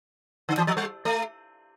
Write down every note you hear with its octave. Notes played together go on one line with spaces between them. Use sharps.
D3
E3
F3
G3
A3